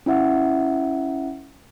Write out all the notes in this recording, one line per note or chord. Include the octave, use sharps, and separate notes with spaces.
C#4 E4 E5 F#5